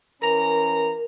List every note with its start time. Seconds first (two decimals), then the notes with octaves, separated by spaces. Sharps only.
0.22 E3 C#4 A#4 A#5